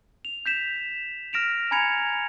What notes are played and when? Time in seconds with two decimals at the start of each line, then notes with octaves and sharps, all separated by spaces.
0.25 F7
0.46 G6 B6 E7
1.33 F6 A#6 D7 E7 F7
1.71 G#5 A#5 B5 G#6 C#7 F7